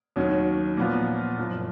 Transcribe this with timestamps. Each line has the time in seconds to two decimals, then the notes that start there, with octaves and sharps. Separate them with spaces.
0.16 D#2 D#3 F#3 C#4
0.77 A#2 F3 B3 F4
1.38 F#1 F#2 F3